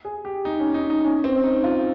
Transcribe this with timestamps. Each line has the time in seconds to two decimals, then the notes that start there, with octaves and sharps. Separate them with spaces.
0.05 G#4
0.25 G4
0.45 D#4
0.60 C#4
0.74 D#4
0.90 D#4
1.04 C#4
1.24 C4
1.44 D#4
1.64 F4